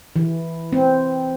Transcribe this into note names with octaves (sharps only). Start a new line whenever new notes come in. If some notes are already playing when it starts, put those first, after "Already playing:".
E3
C4